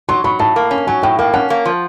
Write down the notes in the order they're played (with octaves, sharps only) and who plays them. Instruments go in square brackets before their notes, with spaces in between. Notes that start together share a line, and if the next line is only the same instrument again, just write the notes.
[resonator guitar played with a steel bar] F#3 [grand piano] C6
[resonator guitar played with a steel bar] F#3 [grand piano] B5
[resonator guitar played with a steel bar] A2 [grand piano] A5
[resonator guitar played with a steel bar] A#3
C#4
[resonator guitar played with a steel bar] F#3 [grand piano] G#5
[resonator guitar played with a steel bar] A2 [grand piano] G5
[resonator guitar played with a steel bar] A#3 [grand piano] G5
[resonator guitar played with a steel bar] C#4 [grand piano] F#5
[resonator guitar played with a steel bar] A#3
F3